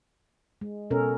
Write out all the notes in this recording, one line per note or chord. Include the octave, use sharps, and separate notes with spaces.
G#3
B2 C#4 A4 A#4